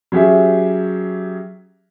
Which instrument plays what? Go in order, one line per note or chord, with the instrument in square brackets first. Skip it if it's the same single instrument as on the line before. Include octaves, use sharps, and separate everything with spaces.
[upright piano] F#3 C#4 G4 G#4 E5